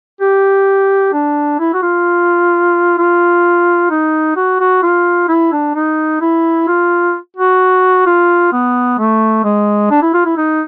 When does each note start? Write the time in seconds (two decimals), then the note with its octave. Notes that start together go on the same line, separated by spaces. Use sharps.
0.21 G4
1.13 D4
1.59 E4
1.74 F#4
1.82 F4
2.98 F4
3.91 D#4
4.36 F#4
4.60 F#4
4.83 F4
5.29 E4
5.52 D4
5.75 D#4
6.21 E4
6.68 F4
7.37 F#4
8.06 F4
8.52 B3
8.98 A3
9.44 G#3
9.91 D4
10.02 E4
10.14 F4
10.25 E4
10.37 D#4